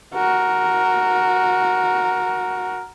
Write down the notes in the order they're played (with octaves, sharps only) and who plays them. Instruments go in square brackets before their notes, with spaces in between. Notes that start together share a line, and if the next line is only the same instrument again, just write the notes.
[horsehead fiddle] F#4 A#4